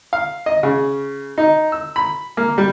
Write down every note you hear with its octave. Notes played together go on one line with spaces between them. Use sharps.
F5
D#5
C#3
D#4
E6
B5
A#3
G3